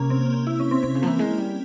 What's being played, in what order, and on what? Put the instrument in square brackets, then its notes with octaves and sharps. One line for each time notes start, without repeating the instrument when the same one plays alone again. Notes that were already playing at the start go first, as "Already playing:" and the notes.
Already playing: [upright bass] C3 [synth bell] A#3 C#4
[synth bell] C4
E4
C#4
C4
[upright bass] C3 [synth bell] C4
[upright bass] C#3
[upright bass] F3 [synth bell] A#3
[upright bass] E3
G#3
G3